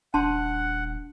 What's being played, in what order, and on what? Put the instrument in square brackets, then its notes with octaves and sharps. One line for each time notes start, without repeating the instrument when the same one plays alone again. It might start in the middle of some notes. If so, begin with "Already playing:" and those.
[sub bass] D#1 [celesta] D4 [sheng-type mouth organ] F#5 [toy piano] A5 C6